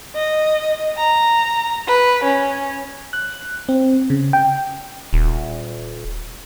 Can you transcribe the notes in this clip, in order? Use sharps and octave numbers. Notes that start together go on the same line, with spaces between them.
D#5
A#5
B4
C#4
F#6
C4
C#3
G5
D#1